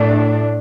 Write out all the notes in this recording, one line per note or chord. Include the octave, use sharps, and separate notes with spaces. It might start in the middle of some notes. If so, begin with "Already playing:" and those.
Already playing: A2 A3 D4